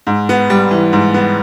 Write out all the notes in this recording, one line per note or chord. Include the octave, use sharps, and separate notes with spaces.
G#2
B3
G3
E3
G#2
B3